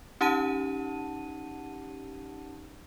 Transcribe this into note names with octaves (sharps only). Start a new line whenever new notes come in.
C#4 D#4 G4 F#5 A5 D#7